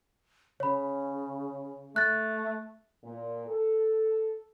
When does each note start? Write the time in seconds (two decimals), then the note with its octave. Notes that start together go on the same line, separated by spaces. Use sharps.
0.60 C#3 C#5 B5
1.96 A3 F#6 A6
3.04 A#2
3.47 A4